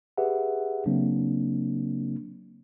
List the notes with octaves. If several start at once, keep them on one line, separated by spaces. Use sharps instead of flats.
G4 G#4 B4 E5 F#5
C#3 F#3 A#3 C4 D4